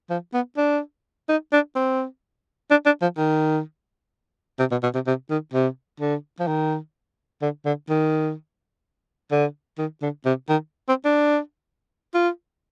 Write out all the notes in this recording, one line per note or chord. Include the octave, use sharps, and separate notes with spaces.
F3
B3
D4
D#4
D4
C4
D4
D4
F3
D#3
C3
B2
B2
C3
C3
D#3
C3
D3
F3
D#3
D3
D3
D#3
D3
D#3
D3
C3
D#3
C4
D4
F4